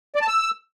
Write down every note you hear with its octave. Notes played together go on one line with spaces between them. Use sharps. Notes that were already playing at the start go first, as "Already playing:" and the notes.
D5
A5
E6